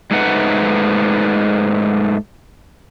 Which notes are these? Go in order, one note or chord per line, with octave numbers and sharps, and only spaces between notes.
G#2 G#3 A3 D#4 B4 F#5